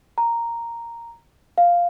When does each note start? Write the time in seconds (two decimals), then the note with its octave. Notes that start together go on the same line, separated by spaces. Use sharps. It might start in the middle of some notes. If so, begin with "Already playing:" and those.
0.18 A#5
1.58 F5